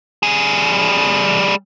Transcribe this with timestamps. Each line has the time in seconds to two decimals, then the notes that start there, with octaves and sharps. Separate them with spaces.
0.23 G3 G#4